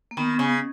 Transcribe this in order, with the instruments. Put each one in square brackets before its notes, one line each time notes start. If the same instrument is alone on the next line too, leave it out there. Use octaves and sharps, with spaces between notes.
[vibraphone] A#3
[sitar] D#3 [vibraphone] B3
[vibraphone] B3
[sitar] C#3